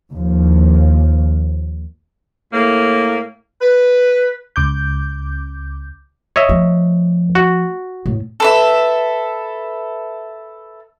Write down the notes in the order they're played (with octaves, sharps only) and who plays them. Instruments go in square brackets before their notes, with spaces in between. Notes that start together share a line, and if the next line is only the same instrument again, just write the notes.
[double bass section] D#2 F3
[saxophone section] A2 A#3
B4
[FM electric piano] C#2 D6 G6
[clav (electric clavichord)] C#5 D#5 E5
[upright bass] F3 A3
[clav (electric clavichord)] F#4
[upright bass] A2
[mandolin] A4 B4 E5